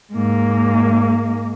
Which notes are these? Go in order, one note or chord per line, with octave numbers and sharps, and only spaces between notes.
G#2 A#3